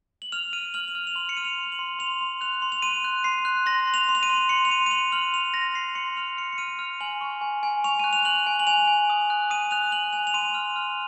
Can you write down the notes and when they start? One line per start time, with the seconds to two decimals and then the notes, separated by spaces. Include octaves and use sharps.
0.22 F#7
0.32 F6 F7
0.53 F6 D#7
0.74 F6 F#7
0.88 F#7
0.95 F6 F7
1.07 F7
1.16 C6 F#7
1.29 C#7
1.37 F6 D#7
1.45 F7
1.58 C6
1.72 F#7
1.79 C6
1.99 C6 F7
2.21 C6
2.41 F#6 F7
2.62 C6
2.72 F7
2.82 C6 D#7
3.04 F#6
3.24 C6 C7
3.45 F#6
3.66 C6 A#6
3.87 C6
3.94 F7
4.09 C6
4.15 F7
4.23 D#7
4.29 C6
4.49 C6 C#7
4.65 F7
4.70 C6 D#7
4.86 D#7
4.91 C6 F7
5.12 F6 F#7
5.33 C6 F7
5.54 C6 A#6
5.75 C6 C7
5.95 C6 C#7
6.17 F6 F7
6.37 F6 C#7
6.52 C#7
6.58 F6 D#7
6.79 F6 F7
7.01 G#5 F#7
7.21 C#6
7.41 G#5
7.63 G#5
7.84 C#6 F7
7.99 F#6 D#7
8.13 F7
8.25 F#6 F#7
8.47 G#5
8.59 F#7
8.67 G#5 F7
8.87 G#5
9.10 D#6
9.30 F#6
9.50 D#6 D#7
9.71 F#6 F7
9.92 F#6 F#7
10.13 G#5 F7
10.27 F7
10.34 C6 D#7
10.54 F6
10.76 F6